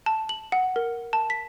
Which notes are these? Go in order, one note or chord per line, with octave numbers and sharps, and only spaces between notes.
A5
F#7
F#5
A#4
A5
B6